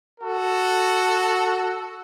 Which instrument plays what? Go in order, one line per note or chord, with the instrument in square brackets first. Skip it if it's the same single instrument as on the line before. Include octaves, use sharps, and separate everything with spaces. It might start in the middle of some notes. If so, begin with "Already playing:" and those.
[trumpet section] F#4 A4